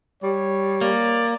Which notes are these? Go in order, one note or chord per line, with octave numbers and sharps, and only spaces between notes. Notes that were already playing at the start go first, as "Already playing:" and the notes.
G3 C#5
A#3 D5